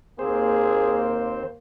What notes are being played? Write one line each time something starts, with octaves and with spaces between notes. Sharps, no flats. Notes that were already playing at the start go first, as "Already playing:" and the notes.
D#2 A#3 C4 G#4 C5